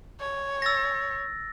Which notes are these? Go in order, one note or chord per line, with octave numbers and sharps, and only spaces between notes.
C#5
E6 A6 A#6